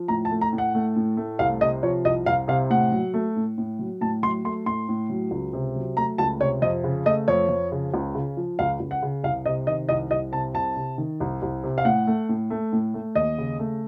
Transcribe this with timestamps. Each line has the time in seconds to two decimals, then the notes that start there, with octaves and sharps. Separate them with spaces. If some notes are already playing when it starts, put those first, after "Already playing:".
Already playing: F3
0.08 A2 A#5
0.25 A5
0.31 A3
0.41 A#5
0.53 A2
0.58 F#5
0.75 A3
0.96 A2
1.17 A3
1.39 C2 F5
1.61 C3 D#5
1.83 F3 C#5
2.05 C2 D#5
2.26 C2 F5
2.48 C3 F5
2.70 A2 F#5
2.92 F#3
3.14 A3
3.36 A2
3.58 A2
3.79 F#3
4.01 A2 A5
4.23 F#3 C6
4.44 A3 C6
4.66 A2 C6
4.89 A2
5.09 F#3
5.31 C#2
5.53 C3
5.76 F#3
5.97 A3 A#5
6.18 C#2 A5
6.40 C3 C#5
6.62 F2 D#5
6.84 C#3
7.06 A3 D#5
7.28 F2 C#5
7.49 F2
7.72 C#3
7.94 C#2
8.15 C#3
8.37 F3
8.59 C#2 F5
8.80 C#2
8.91 F#5
9.02 C#3
9.24 C2 F5
9.46 C3 D#5
9.67 D#3 D#5
9.89 C2 D#5
10.10 C2 D#5
10.32 C3 A5
10.54 C2 A5
10.76 C3
10.98 D#3
11.20 C2
11.42 C2
11.64 C3
11.78 F5
11.85 A2 F#5
12.07 A3
12.29 A2
12.50 A3
12.72 A2
12.94 A3
13.15 D#2 D#5
13.38 C#3
13.59 A3